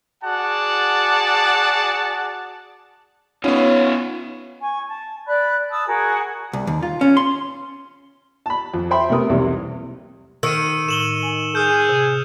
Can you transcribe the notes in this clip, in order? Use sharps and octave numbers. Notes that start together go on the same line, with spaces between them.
F#4 G#4 D5 F#5 A5
B3 C#4 D#4 F4 C#5
G#5 C#6
A5
D5 B5 F#6
A5 B5 D#6 E6
F#4 G#4 A#4
C2
D#2
F4
C#4
C6
A5 B5
F2
C5 E5 G5 B5 C6
C3 A3 B3 A#4 D#6
B1 E2 C3 G3
D#3 E6 C#7 D#7
A2 E7 F#7 G7
G#5
G#4 D#6 F6 G6
C3